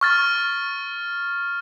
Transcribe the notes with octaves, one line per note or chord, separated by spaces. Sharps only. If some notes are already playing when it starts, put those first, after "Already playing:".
C#6 F6 A6